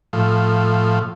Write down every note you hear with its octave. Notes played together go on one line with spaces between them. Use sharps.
A2 F3